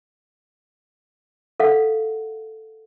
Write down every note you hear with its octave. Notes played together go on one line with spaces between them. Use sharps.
A4 F5 F#5